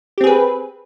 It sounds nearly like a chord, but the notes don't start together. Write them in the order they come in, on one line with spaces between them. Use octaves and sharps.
G4 C4 G#4 B4